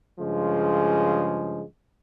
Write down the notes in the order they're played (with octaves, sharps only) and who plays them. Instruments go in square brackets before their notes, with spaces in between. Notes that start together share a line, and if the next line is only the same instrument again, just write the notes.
[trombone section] G2 C#3 F3 G#3